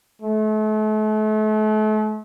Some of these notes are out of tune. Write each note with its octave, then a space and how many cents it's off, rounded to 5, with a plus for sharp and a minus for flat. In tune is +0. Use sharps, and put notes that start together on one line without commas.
A3 -40